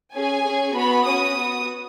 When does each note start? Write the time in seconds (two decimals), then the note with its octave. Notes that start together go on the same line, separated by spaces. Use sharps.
0.14 C#4 G#4 G#5
0.44 C#4 G#4
0.76 B3 F#4 B5
1.06 C#4 F#4 D#6
1.38 B3 F#4